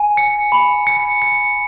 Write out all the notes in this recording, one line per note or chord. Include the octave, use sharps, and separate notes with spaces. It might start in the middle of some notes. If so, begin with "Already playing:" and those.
Already playing: G#5
C#7
B5
C#7
C#7